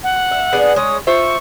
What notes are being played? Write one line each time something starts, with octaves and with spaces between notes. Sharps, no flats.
F#5
E5
B3 D4 G#4
G#3 C#5 D#6
F4 C5 E5 C#6